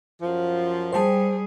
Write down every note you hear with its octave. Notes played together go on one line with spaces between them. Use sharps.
F#2 F3
G3 G#4 C5 G5 A5